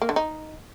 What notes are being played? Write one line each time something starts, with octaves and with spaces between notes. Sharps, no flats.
A#3
D3
D#4